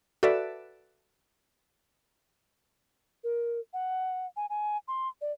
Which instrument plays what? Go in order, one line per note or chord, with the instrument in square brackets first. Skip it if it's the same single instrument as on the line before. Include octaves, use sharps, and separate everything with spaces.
[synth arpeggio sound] F#4 A4 B4 D5 E5
[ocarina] A#4
F#5
G#5
G#5
C6
D5